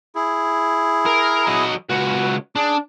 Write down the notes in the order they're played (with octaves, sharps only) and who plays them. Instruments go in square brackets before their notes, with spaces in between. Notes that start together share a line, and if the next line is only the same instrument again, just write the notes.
[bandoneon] E4 G#4
[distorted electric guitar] A#4
F#3 D#5
[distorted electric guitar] C#2 F#4 [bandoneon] B4
[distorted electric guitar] D4 [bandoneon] G#4